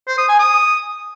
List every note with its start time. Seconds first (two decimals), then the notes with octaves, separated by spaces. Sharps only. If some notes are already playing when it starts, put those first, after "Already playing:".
0.08 C5
0.18 D#6
0.29 G#5
0.39 D#6